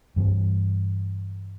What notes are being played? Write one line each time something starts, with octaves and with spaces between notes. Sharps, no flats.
G2 E3 G3